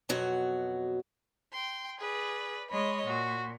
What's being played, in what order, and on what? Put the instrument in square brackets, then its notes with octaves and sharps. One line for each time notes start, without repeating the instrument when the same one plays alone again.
[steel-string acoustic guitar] F2 B2 F#3 F#4
[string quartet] G5 C6
[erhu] G#4 [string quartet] B4 D5
[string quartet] G#3 C#5 D#5 [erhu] B5
[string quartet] A#2 [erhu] F#4